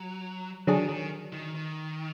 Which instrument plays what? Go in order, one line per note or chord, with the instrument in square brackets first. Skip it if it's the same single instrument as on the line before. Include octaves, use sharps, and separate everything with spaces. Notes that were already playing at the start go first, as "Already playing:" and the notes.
Already playing: [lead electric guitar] F#3
[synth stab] D3 F#3 D4 G#4 [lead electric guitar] D#3
[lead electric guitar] D#3
D#3
D#3